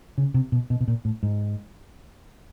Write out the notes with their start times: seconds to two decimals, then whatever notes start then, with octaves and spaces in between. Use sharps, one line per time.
0.18 C#3
0.34 C3
0.52 B2
0.70 B2
0.81 B2
0.88 A#2
1.05 A2
1.23 G#2